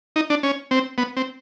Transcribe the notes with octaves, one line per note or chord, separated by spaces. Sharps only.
D#4
D4
C#4
C4
B3
C4